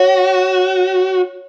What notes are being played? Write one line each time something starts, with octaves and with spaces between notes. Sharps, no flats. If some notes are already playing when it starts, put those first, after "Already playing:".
Already playing: F#4 C#5